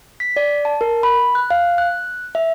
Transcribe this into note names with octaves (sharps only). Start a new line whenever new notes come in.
B6
D5
A5
A#4
B5
F#6
F5
F#6
E5